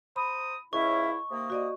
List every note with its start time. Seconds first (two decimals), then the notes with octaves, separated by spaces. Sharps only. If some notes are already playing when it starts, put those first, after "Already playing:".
0.16 C5 A#5 B5 D#6
0.73 C#2 F3 C#4 E4 C#5 D#5 E5 C#6
1.31 C3 D#3 A#3 D#6
1.50 F#4 D5 D#5